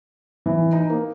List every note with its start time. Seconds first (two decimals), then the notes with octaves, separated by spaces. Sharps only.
0.46 E3
0.73 D#4
0.90 A#3